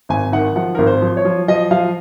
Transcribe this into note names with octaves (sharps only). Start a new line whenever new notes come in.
G#1 G#5
D#3 F#5
F3 F#5
G#1 A#4
C5
F3
C#5
F3
F3 D#5
F3 F5